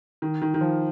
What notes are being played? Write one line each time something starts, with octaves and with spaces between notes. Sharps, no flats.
D#3
D#3
D#3
F3